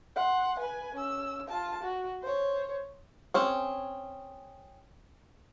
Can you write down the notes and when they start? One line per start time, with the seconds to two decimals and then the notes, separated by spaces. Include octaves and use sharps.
0.16 F#5 C6
0.59 B4 G#5
0.95 C#4 E6
1.49 F4 A5
1.83 F#4
2.22 C5 C#5
3.34 C4 C#4 G#4